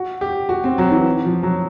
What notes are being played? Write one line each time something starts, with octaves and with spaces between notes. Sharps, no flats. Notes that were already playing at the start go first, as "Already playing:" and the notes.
Already playing: F#4
G4
F#4
C4
F#3
E3
F3
F#3